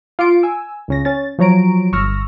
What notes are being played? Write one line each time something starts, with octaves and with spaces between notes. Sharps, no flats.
F4 D6 C7 D7
G#5 E6
C#2 C#3 A#6
C#4 A6
F3 F#3 C#5 A#5 D7
G1 C#6 E6 F6 A#6